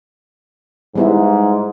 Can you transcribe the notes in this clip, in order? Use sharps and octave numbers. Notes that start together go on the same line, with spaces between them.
G#2 G3 B3 E4